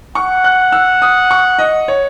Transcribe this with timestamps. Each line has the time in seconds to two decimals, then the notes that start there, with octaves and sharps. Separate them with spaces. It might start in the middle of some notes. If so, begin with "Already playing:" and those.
0.15 F#5 C#6
0.44 F#6
0.72 E6
1.02 D#6
1.31 C#6
1.58 D#5
1.88 C#5